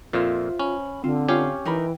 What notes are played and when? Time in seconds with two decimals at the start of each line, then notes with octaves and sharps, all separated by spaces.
0.13 F2 A#2 F4 C5 E5
0.59 C#4 B5
1.04 D3 C4 F4
1.28 C#4 F4 G4 C#5 F5
1.65 E3 D#4 A#4 G5 B5